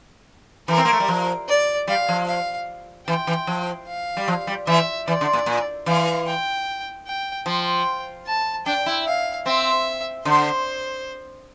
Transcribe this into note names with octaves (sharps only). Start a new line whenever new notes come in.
E3 A#4
C4
A#3
A3
G3
F3
D5
G3 F5
F3
F5
E3 G5
E3
F3
F5
G3
F3
G3
E3 E5
E3 D5
D3
A#2
A#2
E3 F5
G5
G5
F3 G5
A5
D4 G5
E4
F5
C4 E5
D3 C5